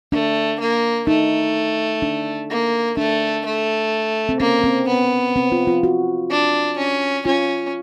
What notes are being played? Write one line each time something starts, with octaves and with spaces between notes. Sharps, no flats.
A3 D4
A#3
A3 D#4
D4
A#3
A3 D4
A3
C4
A#3 C#4
C4
B3
C4
F4
F4
F#4
D4
C#4
C#4 F4